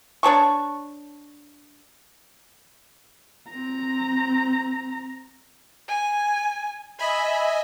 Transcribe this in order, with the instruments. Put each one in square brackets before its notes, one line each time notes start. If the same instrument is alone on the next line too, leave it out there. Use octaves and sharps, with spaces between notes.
[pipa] D4 C#5 A5 C#6
[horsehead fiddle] C4 A#5
[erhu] G#5
[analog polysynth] D#5 E5 G#5 [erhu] B5